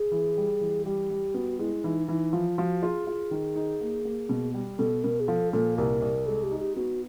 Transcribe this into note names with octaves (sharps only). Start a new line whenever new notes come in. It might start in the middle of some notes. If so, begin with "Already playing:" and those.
Already playing: G#4
E3
G3
E3
G3 G4
G3
B3 F#4
G#3 E4
E3 D#4
E3 D#4
F3 F4
F3 F#4
F4 G#4
F4
D#3
D#4
A#3
A#3
B2
G3
B2 A4
B2 A#4
G#4
F3 A4
A#2 A4
C2 A#4
C2
G#3 A4
G4
D#4
G4
B3 F#4